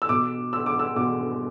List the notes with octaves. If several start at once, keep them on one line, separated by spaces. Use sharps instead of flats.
E6
B2 D6
E6
D6
E6
B2 D6